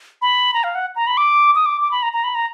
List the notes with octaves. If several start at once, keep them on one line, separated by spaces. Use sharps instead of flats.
B5
A#5
F5
F#5
A#5
B5
D6
D#6
D6
D6
B5
A#5
A#5
B5
A#5